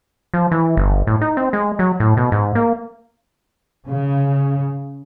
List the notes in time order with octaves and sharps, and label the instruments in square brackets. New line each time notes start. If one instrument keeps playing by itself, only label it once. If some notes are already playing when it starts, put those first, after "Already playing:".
[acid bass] F3
E3
G1
A2
D#4
C4
G#3
F#3
A2
B2
G#2
A#3
[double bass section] C#3